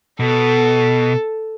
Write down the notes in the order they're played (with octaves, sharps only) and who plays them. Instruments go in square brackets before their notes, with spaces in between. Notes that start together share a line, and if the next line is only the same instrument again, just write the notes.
[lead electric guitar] B2 [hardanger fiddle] A4